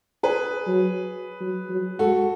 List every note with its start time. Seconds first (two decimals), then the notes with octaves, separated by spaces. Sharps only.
0.23 G#4 B4
0.67 F#3
1.41 F#3
1.69 F#3
1.99 G#3 F#4 A4